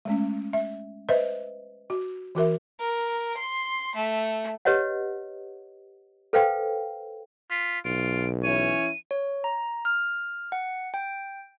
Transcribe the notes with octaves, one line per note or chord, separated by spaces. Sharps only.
G#3 A3 C#4
E5
B4 C5 D#5 E5
F#4
E3 F#4 A#4 E5
A#4
C6
A3
G4 B4 C#5 D#5 F#5
A4 B4 C5 F5 G5
F4 B6
B1 F4 D7
E3 C#4 E4 C#5 D#7
C#5
A#5
F6
F#5
G5